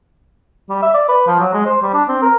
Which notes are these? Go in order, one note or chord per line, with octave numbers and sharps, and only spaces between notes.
G3
E5
D5
B4
F3
F#3
G#3
C5
G3
D4
C4
A#4